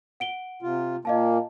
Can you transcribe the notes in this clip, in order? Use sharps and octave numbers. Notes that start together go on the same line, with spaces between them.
F#5 D7 G7
C3 F4
A#2 A#3 D#5 F5 A5